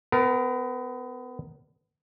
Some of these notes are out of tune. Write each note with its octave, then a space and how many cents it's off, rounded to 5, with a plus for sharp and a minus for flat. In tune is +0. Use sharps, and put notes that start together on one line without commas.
B3 +30 A#4 +0